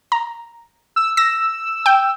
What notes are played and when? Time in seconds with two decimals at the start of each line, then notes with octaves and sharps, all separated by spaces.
0.12 A#5
0.96 E6
1.17 E6 A#6
1.86 G5